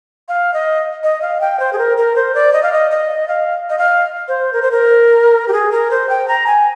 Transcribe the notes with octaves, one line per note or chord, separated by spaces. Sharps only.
F5
D#5
D#5
F5
G5
C5
G#4
A#4
A#4
C5
D5
D#5
F5
D#5
D#5
F5
D#5
F5
C5
A#4
C5
A#4
G4
G#4
A#4
C5
G5
A#5
G#5